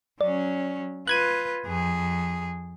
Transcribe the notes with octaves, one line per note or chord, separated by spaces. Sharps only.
F#3 C#4 D5
F4 B4 F#6 G#6 D#7
F2 G#4